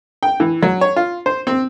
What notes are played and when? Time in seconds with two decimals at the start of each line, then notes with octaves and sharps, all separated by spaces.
0.23 G5
0.40 E3
0.63 F#3
0.81 C#5
0.96 F4
1.26 C5
1.47 C4